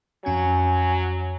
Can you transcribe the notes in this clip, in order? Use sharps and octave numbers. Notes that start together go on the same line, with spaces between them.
F2 F#3 C#4 G#5 G#6